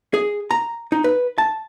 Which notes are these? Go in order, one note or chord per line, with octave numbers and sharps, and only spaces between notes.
G#4
A#5
D#4
B4
A5